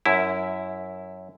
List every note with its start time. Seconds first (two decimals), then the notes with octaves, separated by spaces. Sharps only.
0.06 F#2 E4